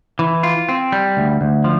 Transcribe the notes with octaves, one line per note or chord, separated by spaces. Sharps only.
E3
F4
C4
G3
D2
D2
F3